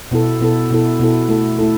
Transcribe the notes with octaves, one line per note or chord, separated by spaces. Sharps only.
B2 B3 E4 A4
B2 B3 E4 A4
B2 B3 E4 A4
B2 B3 E4 A4
A3 E4 A4
A3 E4 A4